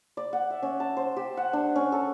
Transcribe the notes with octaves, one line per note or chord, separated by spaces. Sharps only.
D5
F#5
E5
C#4
A5
C5
G4
F#5
D4
C#4
A4